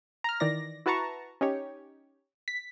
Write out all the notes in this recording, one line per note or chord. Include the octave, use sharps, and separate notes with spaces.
A#5 F6
D#3 E3 D5 A#6
E4 F#4 B4 A5 A#5 C#6
C#4 D#4 G4 C#5
B6